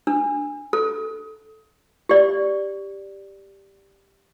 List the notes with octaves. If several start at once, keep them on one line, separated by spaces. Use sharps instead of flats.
D4
A4
G4 D5